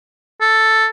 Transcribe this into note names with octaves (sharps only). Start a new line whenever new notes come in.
A4